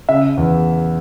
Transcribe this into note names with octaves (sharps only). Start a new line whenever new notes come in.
C#3 E5
E2